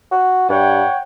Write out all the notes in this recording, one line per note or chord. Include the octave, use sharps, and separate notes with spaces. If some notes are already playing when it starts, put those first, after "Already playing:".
F#4
G2 C#5 F#5 G5